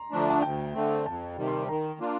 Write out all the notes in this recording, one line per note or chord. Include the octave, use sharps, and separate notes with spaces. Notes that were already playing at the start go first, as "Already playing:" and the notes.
Already playing: A#5 C6
D3 F3 A3 D4 A#5
A5
D2 G5
D3 A3 C4
F2 A5
C3 D#3 G3
C6
D#3 A#5
A#3 D4 F4